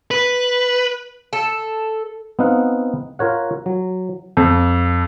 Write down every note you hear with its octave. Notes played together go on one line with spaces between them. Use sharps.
B4
A4
B3 C4 D#4 F5 F#5
F4 A#4 C#5 F#5
F#3
F2